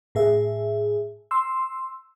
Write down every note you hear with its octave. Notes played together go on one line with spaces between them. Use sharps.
A2 G#4 E5
C6 E6